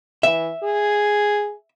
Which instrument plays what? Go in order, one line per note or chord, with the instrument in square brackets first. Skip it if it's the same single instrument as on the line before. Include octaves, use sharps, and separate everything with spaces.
[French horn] E3 [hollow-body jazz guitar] E5
[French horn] G#4